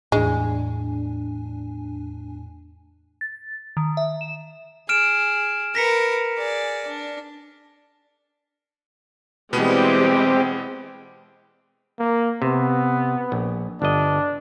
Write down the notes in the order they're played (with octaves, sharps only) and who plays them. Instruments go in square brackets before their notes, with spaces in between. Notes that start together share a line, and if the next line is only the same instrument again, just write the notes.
[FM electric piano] E2 D4 G#5 [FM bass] A2 [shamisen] G#3
[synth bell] A6
D#3
E5
E7
[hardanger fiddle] G#4 [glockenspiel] F6 D7 E7
[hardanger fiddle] A#4 B4 [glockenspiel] A#6 B6 C#7
[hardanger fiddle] G#4 D5
D4
[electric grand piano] B2 B3 [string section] E3 G3 G#3 [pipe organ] C4 G4
[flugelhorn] A#3
[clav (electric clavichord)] C3 [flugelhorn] B3
[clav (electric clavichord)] A#1
[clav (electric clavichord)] G1 D#5 [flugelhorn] D4